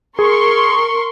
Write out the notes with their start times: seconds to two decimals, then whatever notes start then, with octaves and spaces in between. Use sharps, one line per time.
0.19 G#4 A#4 C6 C#6